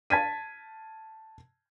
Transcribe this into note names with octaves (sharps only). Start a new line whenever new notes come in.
A5 G#6 B6 D#7